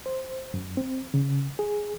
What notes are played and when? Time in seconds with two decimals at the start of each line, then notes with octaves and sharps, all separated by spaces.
0.06 C5
0.54 F#2
0.77 C4
1.14 C#3
1.59 G#4